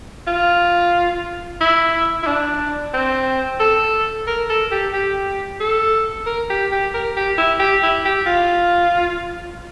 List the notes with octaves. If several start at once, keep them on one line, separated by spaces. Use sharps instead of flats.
F4
E4
E4
D4
C4
A4
A#4
A4
G4
G4
A4
A#4
G4
G4
A#4
G4
E4
G4
E4
G4
F4